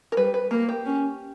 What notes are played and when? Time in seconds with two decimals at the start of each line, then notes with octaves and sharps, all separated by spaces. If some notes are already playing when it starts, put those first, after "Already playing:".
0.12 A#4
0.17 G3 B4
0.34 B4
0.51 A#3 A#4
0.69 G4
0.85 C#4